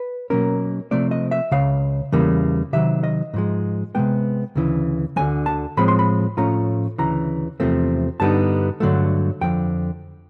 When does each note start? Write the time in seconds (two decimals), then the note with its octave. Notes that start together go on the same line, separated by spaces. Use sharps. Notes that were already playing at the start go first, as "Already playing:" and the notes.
Already playing: B4
0.30 B2 F#3 A#3 C#4 A#4
0.91 C3 F3 A3 C4 D5
1.11 D#5
1.31 E5
1.51 C#2 C#3 F5
2.12 E2 C#3 E3 G3 A#3
2.73 C3 D#3 F#3 E5
3.04 D#5
3.34 G#2 F3 G#3
3.95 C3 D#3 G#3 B3 G5
4.55 D2 C#3 E3
5.16 D2 D3 F#3 G#5
5.46 A5
5.77 A2 F3 G#3 C4 B5
5.88 C6
5.99 B5
6.37 A2 F3 A3 C#4 F4 A#5
6.98 D2 C#3 E3 A#5
7.60 E2 C3 F3 A3 C4
8.20 G2 D3 G3 B3 D#4 A5
8.80 G2 D3 F#3 A3
9.41 F2 D3 F3 G5